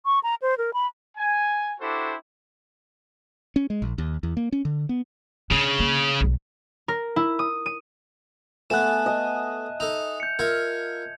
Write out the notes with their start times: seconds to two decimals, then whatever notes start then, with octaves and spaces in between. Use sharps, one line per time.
0.06 C#6
0.23 A#5
0.42 C5
0.58 A#4
0.74 B5
1.18 G#5
1.81 D4 E4 F#4 G4 A4 C5
3.56 C#4
3.70 G#3
3.82 A#1
3.98 D#2
4.23 E2
4.37 A#3
4.52 C#4
4.65 D3
4.89 B3
5.51 C#3 D4
5.80 A#3
6.20 B1 F#3
6.88 A#4
7.16 E4
7.39 D#6
7.66 D#7
8.70 A3 B3 E5 G#5 A5 F#6 E7
9.06 D#5 G#5
9.80 D#4 A4 F7
10.20 G6 C#7
10.39 F4 A#4 E5 G#6